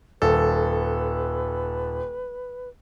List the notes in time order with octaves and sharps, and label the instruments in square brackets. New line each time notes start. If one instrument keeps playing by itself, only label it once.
[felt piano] D#1 [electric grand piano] A4 [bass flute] B4